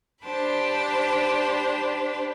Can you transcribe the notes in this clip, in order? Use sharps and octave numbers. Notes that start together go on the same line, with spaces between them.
D4 G4 C5 A5 B5